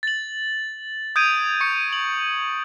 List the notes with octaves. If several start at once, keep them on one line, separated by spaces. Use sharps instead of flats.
A6 F#7
D#6 G6 G#6 D7 D#7
C#6 C#7
F#7